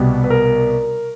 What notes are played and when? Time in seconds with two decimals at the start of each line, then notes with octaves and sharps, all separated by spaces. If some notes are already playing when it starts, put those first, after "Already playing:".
Already playing: C2 B2 G3 B3
0.24 B4
0.30 A#4